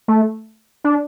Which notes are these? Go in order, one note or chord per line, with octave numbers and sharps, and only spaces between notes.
A3
D4